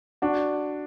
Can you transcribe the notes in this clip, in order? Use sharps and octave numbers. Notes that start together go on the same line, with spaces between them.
D4 F#4